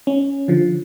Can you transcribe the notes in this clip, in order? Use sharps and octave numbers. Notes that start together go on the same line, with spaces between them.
C#4
D3 F3